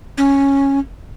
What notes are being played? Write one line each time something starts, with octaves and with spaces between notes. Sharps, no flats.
C#4